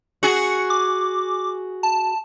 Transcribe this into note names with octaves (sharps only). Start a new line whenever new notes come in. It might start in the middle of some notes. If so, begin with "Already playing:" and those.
F#4 G#4 C#7
D6
A5